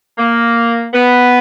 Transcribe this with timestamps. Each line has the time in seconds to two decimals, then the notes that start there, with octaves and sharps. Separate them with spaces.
0.18 A#3
0.94 B3